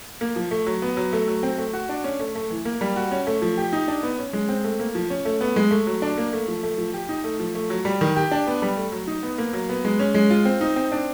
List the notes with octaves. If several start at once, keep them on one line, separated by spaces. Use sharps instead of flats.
A#3
F3
A3
F#3
B3
F#3
A3
F#3
C4
A3
F#4
D4
C#4
A3
A3
E3
A#3
G3
F#4
C#4
A3
F3
G4
D#4
D4
B3
C#4
G#3
C4
A3
A#3
F3
C#4
A3
B3
G#3
A3
F#3
D4
A#3
A3
F3
A3
F3
G4
D#4
A3
F3
A3
F#3
G3
D#3
G4
D4
B3
G3
A3
F#3
D#4
B3
A#3
F#3
B3
G#3
C#4
G#3
F4
C4
D#4
C4
D4